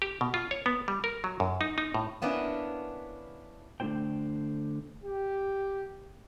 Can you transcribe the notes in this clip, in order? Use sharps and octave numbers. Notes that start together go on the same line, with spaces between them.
G4
B2
F4
C#5
B3
G3
A#4
F#3
F#2
D#4
D#4
A2
A#3 B3 C#4 D4 E4
D3 A3 D4 E4 C5 G5
G4